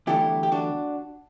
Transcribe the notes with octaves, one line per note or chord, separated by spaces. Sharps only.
E2 D3 F#3 A3 E4 G4
G4
D4 F#4